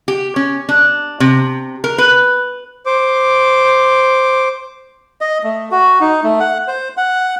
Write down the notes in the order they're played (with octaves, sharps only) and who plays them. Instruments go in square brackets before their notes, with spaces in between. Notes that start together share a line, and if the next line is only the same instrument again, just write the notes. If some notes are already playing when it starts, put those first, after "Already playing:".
[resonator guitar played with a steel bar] G4
C#4
D4
C3
A#4
B4
[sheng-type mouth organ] C5 D6
[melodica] D#5
A3
F#4
D#4
A3
F#5
C5
F#5